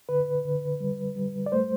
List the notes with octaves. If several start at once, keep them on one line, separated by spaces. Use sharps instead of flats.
D3 B4
D3
G3
G3
D5
A3 C5